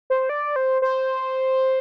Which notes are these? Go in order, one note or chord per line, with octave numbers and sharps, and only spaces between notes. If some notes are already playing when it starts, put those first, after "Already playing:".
C5
D5
C5
C5